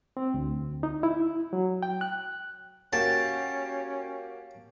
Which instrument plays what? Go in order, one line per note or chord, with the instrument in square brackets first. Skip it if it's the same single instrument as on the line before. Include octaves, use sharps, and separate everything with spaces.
[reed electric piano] C4
D2
D#4
E4
F#3
G5
F#6
[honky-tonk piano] A#3 F#4 G4 [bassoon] C#4 [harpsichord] A5